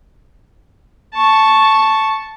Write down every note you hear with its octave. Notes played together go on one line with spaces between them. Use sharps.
A5 C#6